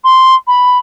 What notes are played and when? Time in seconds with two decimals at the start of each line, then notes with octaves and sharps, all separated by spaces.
0.04 C6
0.47 B5